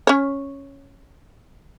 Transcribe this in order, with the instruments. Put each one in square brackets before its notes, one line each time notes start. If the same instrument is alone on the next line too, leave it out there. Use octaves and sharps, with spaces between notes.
[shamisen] C#4 C#5